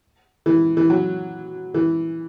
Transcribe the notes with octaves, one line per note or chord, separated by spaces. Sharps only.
E3
E3
F#3
E3